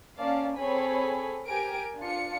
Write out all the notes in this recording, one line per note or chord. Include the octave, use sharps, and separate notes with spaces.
A#3 C#4 D5 F5 A5
C4 G#4 A4 C#5 G#5 B5
G4 A#4 G#5 D7
D4 F4 C#7